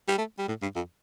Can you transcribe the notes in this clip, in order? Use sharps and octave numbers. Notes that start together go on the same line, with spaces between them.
G3
A3
G3
A2
G2
F2